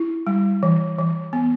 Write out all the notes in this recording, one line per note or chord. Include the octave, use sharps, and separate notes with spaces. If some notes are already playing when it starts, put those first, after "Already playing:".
Already playing: E4
G3
E3
E3
B3